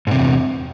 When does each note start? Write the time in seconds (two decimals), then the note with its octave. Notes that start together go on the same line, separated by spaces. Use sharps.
0.07 G#2
0.11 C3
0.16 E2